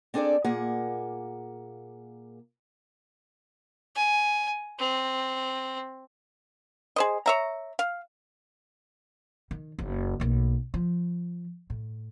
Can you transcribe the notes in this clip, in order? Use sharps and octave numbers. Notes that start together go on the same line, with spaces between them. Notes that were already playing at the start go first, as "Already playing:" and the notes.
C4 D4 G#4 A4 D5
A#2 A#3 G#4 F#5
G#5
C4
G#4 C5 D#5
C#5 E5 A#5
F5
D#3
F#1 D#4
B1 A#3
F3
A2